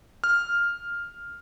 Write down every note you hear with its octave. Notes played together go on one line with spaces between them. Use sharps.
F6